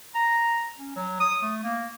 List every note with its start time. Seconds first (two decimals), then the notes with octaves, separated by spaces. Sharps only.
0.15 A#5
0.78 C#4
0.96 F#3
1.20 D#6
1.42 A3
1.63 A#3